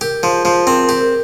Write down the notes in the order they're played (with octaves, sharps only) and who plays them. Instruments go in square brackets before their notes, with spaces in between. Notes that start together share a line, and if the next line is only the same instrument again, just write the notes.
[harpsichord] G4 [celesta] A#4
[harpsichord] F3 [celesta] G#4
[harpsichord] F3 [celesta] G#4
[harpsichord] C4 [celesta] A#4
[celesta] A#4
[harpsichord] G4
[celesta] A#4